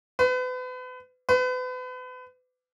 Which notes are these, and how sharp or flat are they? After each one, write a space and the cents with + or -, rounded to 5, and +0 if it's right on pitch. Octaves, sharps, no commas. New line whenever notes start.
B4 +35
B4 +35